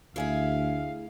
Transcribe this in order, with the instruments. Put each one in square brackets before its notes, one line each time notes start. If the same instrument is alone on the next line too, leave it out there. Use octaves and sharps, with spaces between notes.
[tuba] D2 [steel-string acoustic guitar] E4 G#4 E5 [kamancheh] F5